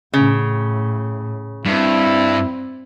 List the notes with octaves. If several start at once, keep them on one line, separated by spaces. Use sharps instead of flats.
A2 C#3
G2 C4 E4